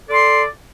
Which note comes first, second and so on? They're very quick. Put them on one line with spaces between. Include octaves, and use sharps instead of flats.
A4 D5 C6